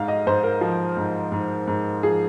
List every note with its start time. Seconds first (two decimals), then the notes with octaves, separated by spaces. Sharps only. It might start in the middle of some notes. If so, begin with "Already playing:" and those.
Already playing: G#2 F5
0.08 D#5
0.27 G#2 C5
0.43 A#4
0.61 F3
0.97 G#2
1.32 G#2
1.67 G#2
2.03 F3 G#4